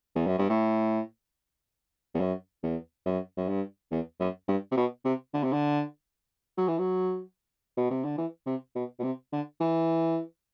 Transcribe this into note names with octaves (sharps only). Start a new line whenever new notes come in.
E2
F#2
G2
A2
E2
F#2
E2
F#2
F#2
G2
E2
F#2
G2
C3
B2
C3
D3
C3
D3
F#3
E3
F#3
B2
C3
D3
E3
C3
B2
B2
C3
D3
E3